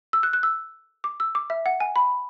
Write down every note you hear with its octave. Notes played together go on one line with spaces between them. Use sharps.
E6
F#6
F#6
E6
D6
E6
D6
E5
F#5
G#5
B5